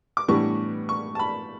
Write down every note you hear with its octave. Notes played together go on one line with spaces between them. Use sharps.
D6
A2 E3 G3 B3 D4 C#6
C#6
A5
B5